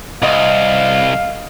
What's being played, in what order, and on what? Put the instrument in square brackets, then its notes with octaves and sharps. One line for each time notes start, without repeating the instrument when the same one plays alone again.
[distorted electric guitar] C2 [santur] D#5 F#5 [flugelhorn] F5